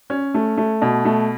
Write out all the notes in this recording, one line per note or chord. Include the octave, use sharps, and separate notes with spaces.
C#4
A3
A3
B2
A3